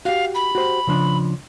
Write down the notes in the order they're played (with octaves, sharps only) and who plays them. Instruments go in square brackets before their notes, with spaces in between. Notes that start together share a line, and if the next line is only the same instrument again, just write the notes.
[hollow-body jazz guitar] F#4 G4 [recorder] F5
[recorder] B5
[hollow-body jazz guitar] F#4 G4 C5
C#3 F3 D4